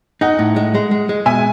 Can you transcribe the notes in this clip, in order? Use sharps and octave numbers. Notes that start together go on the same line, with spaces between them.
D#4 D#5 F#5
A2
G#3
G#3
G#3
G#3
B2 E5 G#5